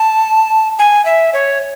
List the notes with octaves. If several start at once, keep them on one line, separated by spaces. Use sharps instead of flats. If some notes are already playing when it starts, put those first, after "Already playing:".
Already playing: A5
G#5
E5
C#5